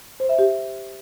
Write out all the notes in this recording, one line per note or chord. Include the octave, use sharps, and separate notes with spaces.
C5
E5
G4